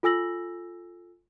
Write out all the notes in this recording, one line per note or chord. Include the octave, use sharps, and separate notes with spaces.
F4 A4 G#5 E6 A#6 F#7